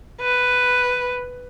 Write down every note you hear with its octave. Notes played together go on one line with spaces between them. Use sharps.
B4